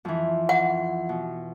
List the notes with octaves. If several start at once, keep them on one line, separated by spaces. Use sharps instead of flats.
F2 E3
F#5
B2